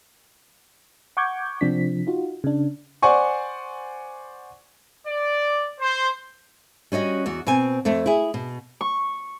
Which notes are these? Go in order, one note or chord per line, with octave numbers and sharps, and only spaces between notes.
F#5 C#6 D6 G6 G#6
C3 F3 C4 D4 B6
D#4 F4 F#4
C#3 D4
C5 D5 F#5 G#5 C#6
D5
C5
G3 C#4 F#4 D#5
E2 F#4
B2 C4 G#5
F2 A3
E4 G#4
B2
C#6